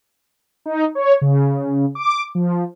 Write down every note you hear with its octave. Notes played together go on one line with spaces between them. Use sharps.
D#4
C#5
C#3
D6
F3